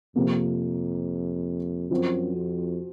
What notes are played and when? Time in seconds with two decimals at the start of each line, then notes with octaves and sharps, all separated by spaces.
0.16 F2 C3 F3 A#3
1.90 F#2 F3 C4 F#4
2.35 F2